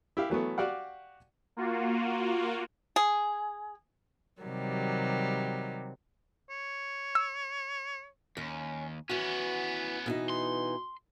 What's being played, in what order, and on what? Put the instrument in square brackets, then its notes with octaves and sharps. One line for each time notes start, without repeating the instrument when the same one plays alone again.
[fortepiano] E4 G4 F5
E3 F#3 A3 B3
F#4 G4 D5 F5 F#5
[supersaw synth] A#3 F4 F#4
[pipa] G#4
[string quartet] C3 D#3 F#3 G3
[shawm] C#5
[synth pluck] E6
[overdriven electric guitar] D#2 [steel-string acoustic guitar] C#4
[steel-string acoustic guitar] E3 F#4 [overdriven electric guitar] B3 C#4
[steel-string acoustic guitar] B2 E3 D#4
[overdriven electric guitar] C6